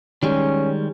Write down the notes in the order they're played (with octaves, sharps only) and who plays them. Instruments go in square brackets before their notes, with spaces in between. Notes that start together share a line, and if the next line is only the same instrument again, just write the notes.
[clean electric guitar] D#3 G3 G#3 [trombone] C#4